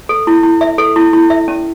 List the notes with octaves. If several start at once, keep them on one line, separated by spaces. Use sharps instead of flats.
A4
E4
E4
E5
A4
E4
E4
E5
C#4